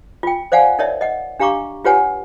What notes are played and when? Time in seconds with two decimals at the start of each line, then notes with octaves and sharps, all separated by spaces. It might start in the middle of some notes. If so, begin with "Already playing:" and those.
0.23 F4 G5
0.52 C5 D5 F5 F#5 G#5
0.79 D#4 A#4 C#5 D5 E5
1.01 D#5 F#5
1.40 D4 G4 F5 A#5 C#6 D6
1.85 F4 G4 B4 C#5 F#5 G#5